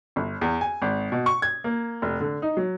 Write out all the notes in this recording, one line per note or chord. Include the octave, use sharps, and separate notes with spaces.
G1
E2
G#5
G#1
B2
C#6
G#6
A#3
F1
D3
D#4
F#3